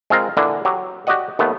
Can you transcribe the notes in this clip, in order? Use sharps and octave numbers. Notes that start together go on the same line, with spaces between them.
G#3 C4 F4 A#4
D3 E3 A#3 D4
F#3 G4
F#4 G4 D5 D#5 F#5
D#2 A3 B3